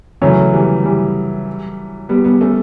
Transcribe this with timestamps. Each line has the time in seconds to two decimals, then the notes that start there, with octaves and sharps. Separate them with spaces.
0.22 C#3 E3 F#3 A3 C#4
0.53 E3 G3
0.84 E3 G3
2.09 G3 B3
2.25 G3 B3
2.41 A3 C#4